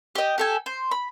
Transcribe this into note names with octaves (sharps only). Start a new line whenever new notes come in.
G4 D#5
G4 A4 G#5
C5
B5